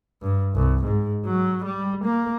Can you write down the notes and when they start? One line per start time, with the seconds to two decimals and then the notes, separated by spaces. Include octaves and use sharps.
0.23 G2
0.55 C2
0.85 G#2
1.25 F#3
1.65 G3
2.04 A#3